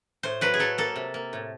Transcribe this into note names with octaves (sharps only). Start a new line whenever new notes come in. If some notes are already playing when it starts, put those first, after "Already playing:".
A2 C5
F#3 B4
G#4
F#3 A4
A#3 A4
C3
A#3
A2